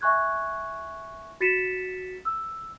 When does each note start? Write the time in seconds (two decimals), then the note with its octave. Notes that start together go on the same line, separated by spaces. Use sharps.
0.01 E5 G#5 C#6 F#6 G#6
1.40 F#4 A6 B6 C#7 D#7 E7
2.25 E6